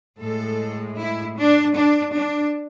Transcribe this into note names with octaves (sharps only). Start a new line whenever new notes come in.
A2 G#3 A4
E4
D4
D4
D4